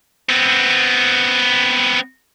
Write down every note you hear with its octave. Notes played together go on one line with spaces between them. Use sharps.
B3 C4